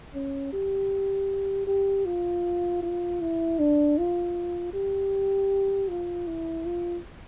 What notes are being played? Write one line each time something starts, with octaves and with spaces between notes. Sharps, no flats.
C#4
G4
G4
F4
F4
E4
D4
F4
G4
F4
E4
F4